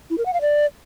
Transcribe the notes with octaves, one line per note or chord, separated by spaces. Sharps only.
E4
A#4
F#5
F5
D5